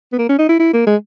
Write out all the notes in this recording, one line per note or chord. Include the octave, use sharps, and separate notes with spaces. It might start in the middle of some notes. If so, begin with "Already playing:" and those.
B3
A#3
C#4
D#4
E4
E4
A#3
G#3